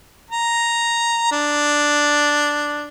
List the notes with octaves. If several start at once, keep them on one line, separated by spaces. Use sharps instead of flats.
A#5
D4